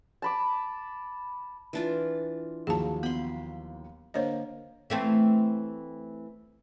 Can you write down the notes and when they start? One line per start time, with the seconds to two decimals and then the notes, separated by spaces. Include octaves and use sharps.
0.22 A5 B5 D6
1.73 E3 D4 F4
2.67 D#2 F3 F#3 G#4 A5
3.03 B3 B5 C6
4.14 D3 A#3 C5 C#5 D#5
4.90 E3 A3 C4